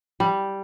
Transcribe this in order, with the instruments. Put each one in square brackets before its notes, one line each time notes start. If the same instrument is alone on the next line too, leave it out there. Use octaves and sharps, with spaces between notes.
[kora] G3